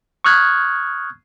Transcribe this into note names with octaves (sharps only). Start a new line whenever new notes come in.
C#6 D#6 F6 F#6 G#6